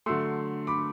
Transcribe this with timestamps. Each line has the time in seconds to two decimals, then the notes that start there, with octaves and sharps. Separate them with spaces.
0.06 D3 F#3 A3 C6 E6
0.67 B5 D6